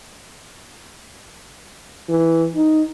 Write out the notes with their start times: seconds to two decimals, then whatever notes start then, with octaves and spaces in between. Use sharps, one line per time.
2.09 E3
2.56 D#4